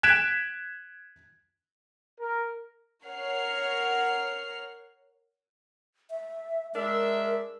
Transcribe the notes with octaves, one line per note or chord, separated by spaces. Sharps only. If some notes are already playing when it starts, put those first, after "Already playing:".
F#6 G#6 B6 D7 E7
A#4
A#4 C#5 F#5 F6 C7
E5
G#3 D4 A#4 E5